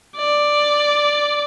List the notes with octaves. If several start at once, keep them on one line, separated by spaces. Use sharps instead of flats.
D5